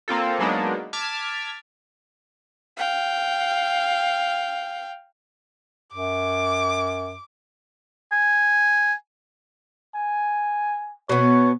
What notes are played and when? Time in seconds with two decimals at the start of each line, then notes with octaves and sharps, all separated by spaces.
0.08 A#3 C4 F4 A4
0.39 F#3 G#3 A#3 B3 D4 D#4
0.93 A5 D6 F6 G#6 B6
2.77 F5 G5
5.94 F#2 D6
8.12 G#5
9.95 G#5
11.09 B2 B3 C#5